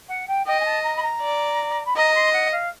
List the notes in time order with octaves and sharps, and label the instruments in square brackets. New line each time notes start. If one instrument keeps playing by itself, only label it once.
[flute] F#5
G5
[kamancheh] D#5 [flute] G5
[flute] G#5
A5
A#5
B5
A#5
[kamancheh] D5
[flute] B5
[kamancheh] D#5 [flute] A#5
[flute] C6
F#5
F5